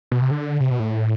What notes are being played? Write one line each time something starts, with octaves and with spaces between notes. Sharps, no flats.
B2
C3
D3
C3
B2
A2